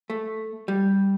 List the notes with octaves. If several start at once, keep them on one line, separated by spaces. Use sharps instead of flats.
A3
G3